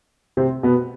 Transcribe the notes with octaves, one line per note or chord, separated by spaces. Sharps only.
C3 C4
B2 B3